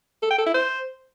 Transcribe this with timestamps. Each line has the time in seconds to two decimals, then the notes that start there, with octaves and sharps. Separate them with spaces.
0.23 A4
0.31 G5
0.38 A4
0.46 E4
0.54 C5